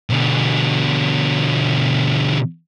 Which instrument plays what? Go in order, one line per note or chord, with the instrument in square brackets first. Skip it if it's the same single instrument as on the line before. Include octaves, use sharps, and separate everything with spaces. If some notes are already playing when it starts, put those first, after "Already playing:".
[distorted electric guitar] B2 D3